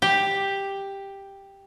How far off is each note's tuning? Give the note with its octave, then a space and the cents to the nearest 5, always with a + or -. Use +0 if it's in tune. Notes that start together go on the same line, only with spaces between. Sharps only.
G4 +5